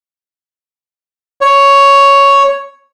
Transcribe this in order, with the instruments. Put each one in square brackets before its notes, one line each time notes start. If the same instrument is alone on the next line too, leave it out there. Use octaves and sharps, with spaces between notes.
[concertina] C#5